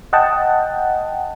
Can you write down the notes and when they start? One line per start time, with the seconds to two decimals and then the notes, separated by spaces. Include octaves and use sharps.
0.13 D#5 F#5 G5 A5